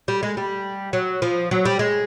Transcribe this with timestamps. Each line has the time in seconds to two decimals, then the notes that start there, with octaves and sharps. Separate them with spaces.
0.08 G3
0.23 G#3
0.37 G3
0.93 F#3
1.22 F3
1.51 F#3
1.65 G3
1.79 G#3